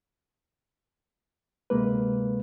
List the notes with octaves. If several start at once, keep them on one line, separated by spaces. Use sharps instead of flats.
D2 C3 G#3 A#3 B4